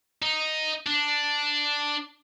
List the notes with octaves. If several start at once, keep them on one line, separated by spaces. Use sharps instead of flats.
D#4
D4